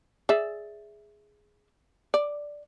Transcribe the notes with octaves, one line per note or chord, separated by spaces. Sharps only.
G#4 D5 E5
D5